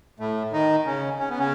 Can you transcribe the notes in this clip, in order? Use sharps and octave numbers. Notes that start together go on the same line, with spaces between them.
A2 A3
D#3 D#4
C#3 C#4
C#4
B3
C#3 C#4